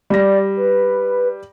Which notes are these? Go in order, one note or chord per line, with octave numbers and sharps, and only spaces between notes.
G3 D5 A#6
B4